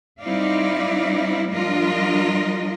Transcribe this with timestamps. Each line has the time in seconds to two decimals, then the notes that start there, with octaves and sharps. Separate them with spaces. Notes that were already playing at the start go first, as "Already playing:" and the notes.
0.21 G3 C4 D#4 E4 D5 F5
1.51 F3 G3 D4 F4 A#4 D#5